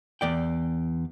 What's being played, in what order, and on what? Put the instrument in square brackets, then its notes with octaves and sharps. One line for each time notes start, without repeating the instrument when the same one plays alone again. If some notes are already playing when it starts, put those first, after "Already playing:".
[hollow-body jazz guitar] E2 D5 G5